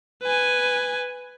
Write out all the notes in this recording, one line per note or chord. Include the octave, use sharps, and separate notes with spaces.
B4 G#5